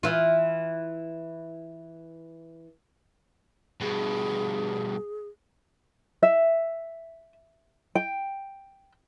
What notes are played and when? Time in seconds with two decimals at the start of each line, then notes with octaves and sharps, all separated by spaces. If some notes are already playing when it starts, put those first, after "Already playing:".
0.03 E3 F4
3.81 G2 B2 G#4
6.23 E5
7.95 G5